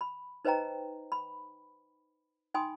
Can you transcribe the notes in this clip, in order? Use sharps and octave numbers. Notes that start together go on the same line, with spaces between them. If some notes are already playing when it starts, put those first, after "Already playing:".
B5
D#4 B4 C5 D#5 G5 A#5
B5
D#4 G5 G#5 B5 C6 D#6